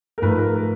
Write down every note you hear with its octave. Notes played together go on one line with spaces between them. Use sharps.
A#4
G#2 F3 A3 B4
A#4
A#4